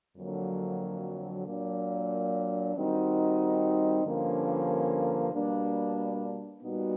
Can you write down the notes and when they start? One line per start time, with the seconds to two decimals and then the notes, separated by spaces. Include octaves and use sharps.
0.16 F2 D3 F#3 A#3
1.46 A#2 F#3 A#3 D4
2.75 D#3 G3 C4 D#4 F#4
4.04 G2 D3 F3 A#3 C#4
5.33 B2 G3 A#3 D4
6.62 A#2 G3 B3 D#4 F#4